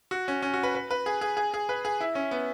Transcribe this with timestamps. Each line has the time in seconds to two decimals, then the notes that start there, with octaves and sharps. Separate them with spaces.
0.11 F#4
0.28 C#4
0.42 C#4
0.54 F#4
0.63 B4
0.75 B4
0.91 B4
1.06 G#4
1.21 G#4
1.37 G#4
1.54 G#4
1.69 B4
1.85 G#4
2.01 E4
2.15 C#4
2.31 B3